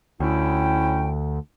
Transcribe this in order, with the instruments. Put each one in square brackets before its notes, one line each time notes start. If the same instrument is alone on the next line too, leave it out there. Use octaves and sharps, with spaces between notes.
[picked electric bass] D2 [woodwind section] C#4 E4 G5